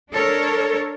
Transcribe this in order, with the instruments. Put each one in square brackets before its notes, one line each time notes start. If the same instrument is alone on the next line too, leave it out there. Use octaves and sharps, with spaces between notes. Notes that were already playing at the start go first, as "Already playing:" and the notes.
[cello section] D4 A4 A#4 C#5